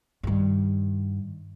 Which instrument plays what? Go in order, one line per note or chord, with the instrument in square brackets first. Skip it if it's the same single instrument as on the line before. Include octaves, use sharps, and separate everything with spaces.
[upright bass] G2 D#3